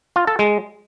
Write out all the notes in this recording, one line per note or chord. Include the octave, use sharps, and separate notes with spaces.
F4
A4
G#3